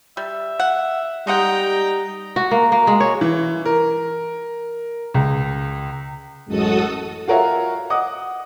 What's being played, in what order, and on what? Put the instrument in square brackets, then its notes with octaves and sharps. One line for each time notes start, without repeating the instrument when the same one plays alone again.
[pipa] G3 [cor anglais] E5
[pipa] F#5
[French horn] G3 [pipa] G#3 D#5 F#5 [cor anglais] D#4 [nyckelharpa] G5 A#5
[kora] F#4
A#3
A#3
G#3
C#5
[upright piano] E3
A#4
C#2
[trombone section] A1 F#2 G#3 [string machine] F#4 A4 D#6
[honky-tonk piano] F4 F#4 A#4 C#5 E5 F5
D#5 F#5 D6 D#6